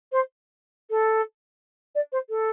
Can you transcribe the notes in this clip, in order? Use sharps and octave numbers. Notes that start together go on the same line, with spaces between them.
C5
A4
D5
C5
A4